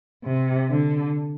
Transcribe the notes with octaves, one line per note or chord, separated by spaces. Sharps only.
C3
D3